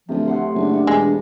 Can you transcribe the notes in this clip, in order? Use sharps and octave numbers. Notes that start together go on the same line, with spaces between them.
D1 C3 F3
A2 F#5 C6
F#1 D4
G2 G3 C#6
E1 G#3